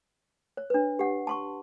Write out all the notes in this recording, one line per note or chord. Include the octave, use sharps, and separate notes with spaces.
C#5
D4 B4
G4 F#5
A5 C6 C#6